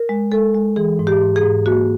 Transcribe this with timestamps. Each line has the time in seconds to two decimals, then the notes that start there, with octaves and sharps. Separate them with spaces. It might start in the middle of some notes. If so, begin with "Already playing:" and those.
Already playing: A#4
0.09 G#3
0.32 G#3 A4
0.54 G#3
0.76 E3 G#4
0.99 G#2
1.07 G4
1.21 G#2
1.36 G#4
1.44 G#2
1.66 A#3 F#4